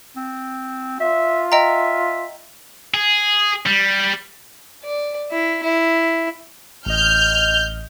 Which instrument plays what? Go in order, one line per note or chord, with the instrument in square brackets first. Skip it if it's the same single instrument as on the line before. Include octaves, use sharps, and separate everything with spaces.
[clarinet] C4
[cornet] F4 [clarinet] E5
[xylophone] D#5 G5 A#5 [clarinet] E5
[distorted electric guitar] G#4
G3
[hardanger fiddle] D5
E4
E4
[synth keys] A1 D#5 [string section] F6 G6